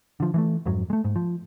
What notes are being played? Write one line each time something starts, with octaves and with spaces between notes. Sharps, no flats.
D3 F3
E3 G#3 A3
F2 G#2 F#3
G#3 A3
G#2
F3